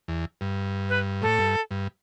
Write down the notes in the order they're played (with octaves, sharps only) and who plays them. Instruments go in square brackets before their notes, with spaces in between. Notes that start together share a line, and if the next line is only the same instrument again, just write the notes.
[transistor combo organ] E2
G2
[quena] B4
[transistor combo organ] A2 [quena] A4
[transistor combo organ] G2
G2